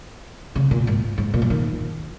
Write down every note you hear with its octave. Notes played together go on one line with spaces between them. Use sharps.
C#3
A#2
G#2
G#2
A#2
F3
D#3